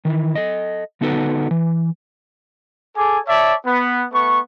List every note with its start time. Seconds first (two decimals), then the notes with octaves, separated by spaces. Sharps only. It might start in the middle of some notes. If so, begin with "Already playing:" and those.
0.05 D#3 E3
0.35 A4 D#5
1.01 D3 B3 D#4 F#4 A4 B4
1.51 E3
2.97 G#4 A4 G#5 D6
3.27 C#5 D5 E5 A5
3.66 B3
4.13 A3 B3 C#6